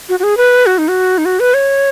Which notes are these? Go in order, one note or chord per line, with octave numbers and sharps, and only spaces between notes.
F#4
F#4
G#4
B4
F#4
D#4
F#4
D#4
F#4
B4
C#5